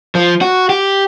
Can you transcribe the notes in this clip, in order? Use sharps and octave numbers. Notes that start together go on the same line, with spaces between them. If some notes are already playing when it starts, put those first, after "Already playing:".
F3
F#4
G4